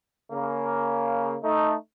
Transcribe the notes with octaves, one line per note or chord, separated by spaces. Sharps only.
C#3 A#3
A3 D#4